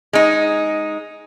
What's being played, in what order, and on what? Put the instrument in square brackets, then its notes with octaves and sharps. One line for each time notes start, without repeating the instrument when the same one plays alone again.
[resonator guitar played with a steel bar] G#3 D#4